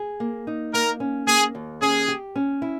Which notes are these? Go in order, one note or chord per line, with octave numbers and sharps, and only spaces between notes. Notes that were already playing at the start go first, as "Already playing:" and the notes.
Already playing: G#4
A#3
D#4
A#3 A#4
C#4
A#3 G#4
D#2
C#4 G#4
G4
C#4
E4